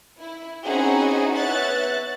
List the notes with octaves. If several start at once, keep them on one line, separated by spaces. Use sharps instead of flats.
E4
C4 C#4 D#4 E4 F#4 G#4
B3 C#5 E5 F#5 F#6 A6